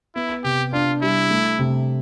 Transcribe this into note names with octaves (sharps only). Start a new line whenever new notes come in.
B3 E4
C3 G4
D4 F4
G3 E4
A3
C3